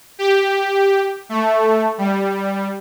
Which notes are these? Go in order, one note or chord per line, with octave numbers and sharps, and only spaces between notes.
G4
A3
G3